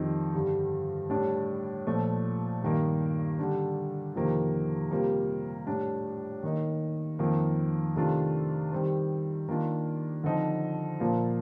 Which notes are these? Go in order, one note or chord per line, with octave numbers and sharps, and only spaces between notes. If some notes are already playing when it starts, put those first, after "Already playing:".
Already playing: F2 D#3 G3 C4 D#4
G2 D3 G3
A2 G3 D4
A#2 F3 A3
G2 D#3 A#3
D3 G3 D4
F2 C3 D#3 A#3
C3 G3 A#3 F4
A2 G3 D4
D#3 A#3 D#4
F2 D#3 A#3
C3 D#3 A3 D4 F4
D#3 G3 C4
D#3 A#3 D4 F4
D3 F3 C4 D#4
A#2 F3 A#3 F4